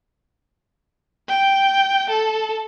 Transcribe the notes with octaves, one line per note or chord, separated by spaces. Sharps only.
G5
A4